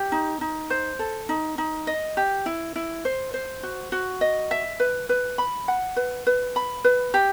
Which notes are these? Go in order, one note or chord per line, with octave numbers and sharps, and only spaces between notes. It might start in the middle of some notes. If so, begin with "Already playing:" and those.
Already playing: G4
D#4
D#4
C5
A4
D#4
D#4
D#5
G4
E4
E4
C5
C5
F#4
F#4
D#5
E5
B4
B4
B5
F#5
B4
B4
B5
B4
G4